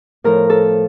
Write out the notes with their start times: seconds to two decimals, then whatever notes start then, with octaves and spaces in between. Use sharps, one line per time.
0.24 A2 F3 A#4
0.50 A4